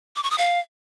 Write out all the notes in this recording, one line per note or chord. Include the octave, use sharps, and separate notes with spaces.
D6
C#6
D#6
F5